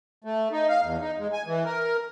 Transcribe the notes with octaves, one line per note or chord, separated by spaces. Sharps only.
A3
D#4
F5
E2
D#4
G#3
G#5
E3
A#4